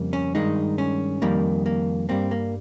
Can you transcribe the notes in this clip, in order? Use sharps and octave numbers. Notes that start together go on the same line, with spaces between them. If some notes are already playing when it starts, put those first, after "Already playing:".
Already playing: F2 C#3 G3 A#3
C#4
G2 D#3 G#3 D#4
C#4
F2 D#3 G3 A#3
A#3
G2 G3 A#3 C4
A#3